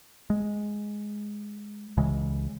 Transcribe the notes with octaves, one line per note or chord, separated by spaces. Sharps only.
G#3
C#2 C#3 E3 G#3